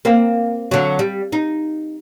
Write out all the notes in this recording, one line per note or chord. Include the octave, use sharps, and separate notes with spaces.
A#3 C4
D3 F#3
G3
D#4